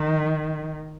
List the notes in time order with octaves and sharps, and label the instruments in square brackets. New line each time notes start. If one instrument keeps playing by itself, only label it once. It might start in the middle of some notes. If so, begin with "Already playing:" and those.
Already playing: [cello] D#3